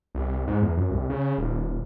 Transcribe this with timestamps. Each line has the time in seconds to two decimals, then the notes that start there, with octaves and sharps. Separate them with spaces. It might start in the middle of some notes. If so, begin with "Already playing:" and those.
0.15 C2
0.47 G#2
0.62 E2
0.77 F#2
0.91 C2
1.10 C#3
1.38 D#1